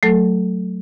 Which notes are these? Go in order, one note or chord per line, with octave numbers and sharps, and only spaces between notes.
F#3 A3 A4